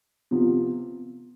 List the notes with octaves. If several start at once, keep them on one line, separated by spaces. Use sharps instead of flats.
C3 F3 B3